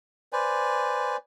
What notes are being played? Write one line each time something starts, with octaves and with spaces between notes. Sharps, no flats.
B4 C5 D5 G#5